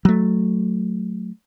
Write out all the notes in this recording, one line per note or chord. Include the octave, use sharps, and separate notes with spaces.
F#3 A3